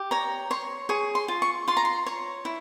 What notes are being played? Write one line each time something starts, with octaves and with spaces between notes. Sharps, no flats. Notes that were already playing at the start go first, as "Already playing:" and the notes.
Already playing: G4
C#5 A#5
C#5 C6
G#4 C#6
C6
F4
C#6
F4 C6
A#5
C6
C#5
E4